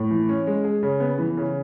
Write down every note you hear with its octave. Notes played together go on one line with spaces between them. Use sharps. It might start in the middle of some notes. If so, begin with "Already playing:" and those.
Already playing: A2
E3
C#4
G#3
G#4
C#3
B3
E3
C#3